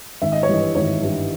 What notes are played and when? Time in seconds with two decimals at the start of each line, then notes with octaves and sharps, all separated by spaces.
0.22 G#1 E5
0.32 D#5
0.43 C#5
0.49 G2 E3 G3 D#5
0.75 G#1 C#5
1.02 G2 E3 G3